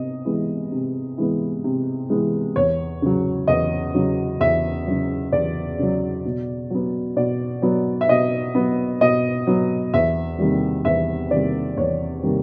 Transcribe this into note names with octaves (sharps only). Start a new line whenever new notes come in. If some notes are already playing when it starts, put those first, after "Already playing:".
Already playing: C3 B3 D#5
E3 G#3 B3
C3
E3 G#3 B3
C3
E3 G#3 B3
E2 C#5
C#3 F#3
E2 D#5
C#3 F#3
E2 E5
C#3 F#3
E2 D5
C#3 F#3
B2
F#3 B3
B2 D5
F#3 B3
E5
B2 D#5
F#3 B3
B2 D#5
F#3 B3
E2 E5
C3 D#3 G3 A#3
E2 E5
C3 D#3 G3 A#3 D5
E2 C#5
C3 D#3 G3 A#3